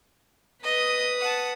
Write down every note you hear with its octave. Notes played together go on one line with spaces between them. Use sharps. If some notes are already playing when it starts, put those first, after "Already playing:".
B4 D#5 D#6
F#5 A5